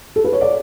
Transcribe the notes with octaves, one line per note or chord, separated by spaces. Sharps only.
A4
B4
C#5
D5